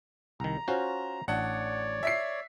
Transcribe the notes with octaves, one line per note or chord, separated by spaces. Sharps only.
C2 D#3 A#5
C#4 F4 F#4 C5
A1 D4 C#5 D5 F#5
E5 B6 C7